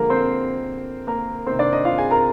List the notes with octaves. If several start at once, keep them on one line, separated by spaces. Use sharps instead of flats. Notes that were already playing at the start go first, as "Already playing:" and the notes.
Already playing: D3 F3 G#3 A#3 A#4
C4 C5
A#3 A#4
C3 D#3 A#3 C4 D#4 C5
D4 D5
D#4 D#5
F4 F5
G#4 G#5
A#4 A#5